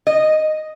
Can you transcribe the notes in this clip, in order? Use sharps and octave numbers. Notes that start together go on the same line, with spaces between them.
D#5